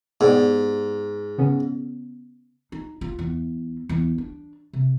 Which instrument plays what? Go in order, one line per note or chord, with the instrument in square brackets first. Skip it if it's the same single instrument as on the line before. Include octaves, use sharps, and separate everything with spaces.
[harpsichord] G#2 [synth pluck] B3 G4 D5
[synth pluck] C#3 B3 C#4
[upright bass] D#4
F4
E2
E2
D4
C3